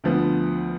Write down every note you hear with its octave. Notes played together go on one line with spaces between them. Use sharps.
D2 D3 F3 B3